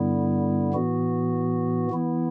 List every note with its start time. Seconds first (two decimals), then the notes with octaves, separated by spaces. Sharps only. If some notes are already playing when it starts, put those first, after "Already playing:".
Already playing: G2 D3 G3 B3 E4
0.74 A2 E3 B3 F#4
1.90 E3 B3 E4